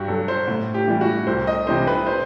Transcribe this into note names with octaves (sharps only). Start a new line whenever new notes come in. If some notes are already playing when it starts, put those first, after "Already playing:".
Already playing: G2 F#4 G4
F#3 A4
C5
A2
G4
E3 G3
F#4
C2 C5
D#5
C3 E3 G3 C5
B4
C5